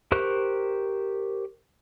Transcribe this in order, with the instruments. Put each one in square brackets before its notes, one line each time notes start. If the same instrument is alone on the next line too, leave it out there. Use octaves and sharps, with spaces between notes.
[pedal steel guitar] G4 A#4 C5 C#6 F#6